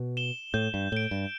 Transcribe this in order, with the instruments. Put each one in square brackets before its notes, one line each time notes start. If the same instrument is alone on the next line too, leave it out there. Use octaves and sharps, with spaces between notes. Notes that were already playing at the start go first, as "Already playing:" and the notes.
Already playing: [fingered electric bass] B2
[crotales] E7 G7
[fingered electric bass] A2 [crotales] G6
[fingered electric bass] G2
[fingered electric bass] A2 [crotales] D7 G7
[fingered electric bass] G2